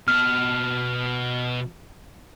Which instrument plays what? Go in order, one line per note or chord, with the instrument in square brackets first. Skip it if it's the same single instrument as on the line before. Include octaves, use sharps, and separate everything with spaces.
[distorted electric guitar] B2 A5 [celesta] F6